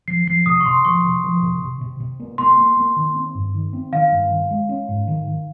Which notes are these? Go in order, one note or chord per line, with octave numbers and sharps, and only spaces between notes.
F3 C7
F3 C7
C3 D#6
C#6
C3 C6
F3 C#6
C3
F3
C3
C3
C3
C3
A#3
A#3 C6
A#3
A#3
D#3
C4
G2
D#3
C4
D#3 F5
G2
D#3
G#3
C#4
G#2
D#3
D#3